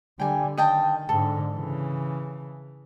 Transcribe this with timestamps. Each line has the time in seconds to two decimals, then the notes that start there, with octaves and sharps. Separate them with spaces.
0.20 D3 G3 G5 G#5
0.58 D#3 D#5 G5 A5
1.09 G#2 D3 A4
1.53 C#3 E3